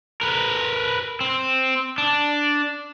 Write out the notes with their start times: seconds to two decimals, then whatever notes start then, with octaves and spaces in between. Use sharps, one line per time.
0.21 A#4 B4
1.21 C4
1.98 D4